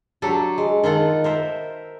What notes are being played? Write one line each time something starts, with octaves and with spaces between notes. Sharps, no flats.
F#3 D4 G4 A4
G#3
D#3 F4 A4 F#5
A#4 C5 E5